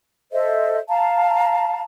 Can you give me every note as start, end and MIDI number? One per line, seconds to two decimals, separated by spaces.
0.32 0.78 69
0.32 0.78 72
0.32 0.78 75
0.32 0.78 76
0.89 1.82 77
0.89 1.82 81
0.89 1.82 82